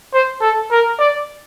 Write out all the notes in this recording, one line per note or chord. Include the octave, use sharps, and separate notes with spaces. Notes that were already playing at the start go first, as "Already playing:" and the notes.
C5
A4
A#4
D5